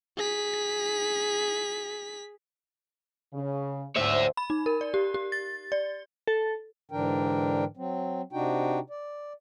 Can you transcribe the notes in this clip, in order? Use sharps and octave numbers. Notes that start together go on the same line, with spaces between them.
G#4 B6
C#3
D2 C5 C#5 E5
B5
D#4
A#4
D5
G4
G4
A6
D5
A4
G#2 D3 E3 D4 A#4 G5
F#3 C4
C3 D4 D#4 F#4 G5
D5